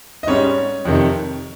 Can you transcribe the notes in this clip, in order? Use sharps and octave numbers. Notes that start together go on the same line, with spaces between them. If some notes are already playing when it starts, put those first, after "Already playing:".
D#5
G#2 G3 C#4 C#5
F2 C3 D#3